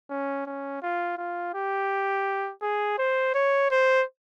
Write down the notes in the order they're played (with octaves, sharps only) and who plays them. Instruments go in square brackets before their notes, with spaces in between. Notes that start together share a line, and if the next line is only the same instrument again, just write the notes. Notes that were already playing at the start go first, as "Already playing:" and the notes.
[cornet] C#4
C#4
F4
F4
G4
G#4
C5
C#5
C5